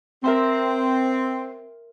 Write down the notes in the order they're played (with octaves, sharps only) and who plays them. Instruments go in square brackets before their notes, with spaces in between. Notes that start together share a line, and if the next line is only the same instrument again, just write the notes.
[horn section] C4 [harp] A#4 E5 C6